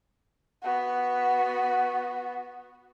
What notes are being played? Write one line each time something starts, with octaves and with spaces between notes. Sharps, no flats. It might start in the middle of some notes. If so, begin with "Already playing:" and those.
B3 F#4